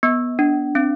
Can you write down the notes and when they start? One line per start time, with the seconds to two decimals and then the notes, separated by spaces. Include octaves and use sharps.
0.03 B3
0.39 D4
0.75 C4